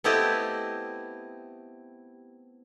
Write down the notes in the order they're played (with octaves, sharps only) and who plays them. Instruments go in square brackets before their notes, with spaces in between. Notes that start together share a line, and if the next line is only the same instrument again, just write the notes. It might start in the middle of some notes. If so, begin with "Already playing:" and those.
[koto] A3 B3 C4 E4 G4 D#5